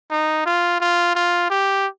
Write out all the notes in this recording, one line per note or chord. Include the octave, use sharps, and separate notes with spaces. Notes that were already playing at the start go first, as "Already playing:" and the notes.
D#4
F4
F4
F4
G4